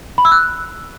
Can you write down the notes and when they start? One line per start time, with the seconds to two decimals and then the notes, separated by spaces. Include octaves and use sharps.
0.18 B5
0.25 E6
0.32 F#6